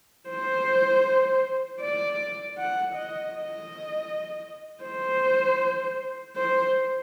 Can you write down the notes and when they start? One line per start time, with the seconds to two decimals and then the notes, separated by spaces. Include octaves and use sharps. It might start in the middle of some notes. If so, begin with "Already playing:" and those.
0.29 C5
1.81 D5
2.58 F#5
2.95 D#5
3.33 D#5
4.84 C5
6.36 C5